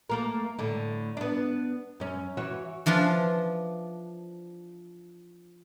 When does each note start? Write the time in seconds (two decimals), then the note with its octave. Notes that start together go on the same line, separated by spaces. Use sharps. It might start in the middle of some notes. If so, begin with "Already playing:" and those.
0.10 A3 A#3 A#4
0.59 A2 D3
1.17 B3 D4
2.00 F#2 C#4
2.37 E3 F#4 C#5
2.86 E3 F3 D4 F4